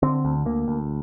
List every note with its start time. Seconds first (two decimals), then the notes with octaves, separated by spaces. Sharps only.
0.03 D3 C4
0.25 D2
0.46 D2 A#3
0.68 D2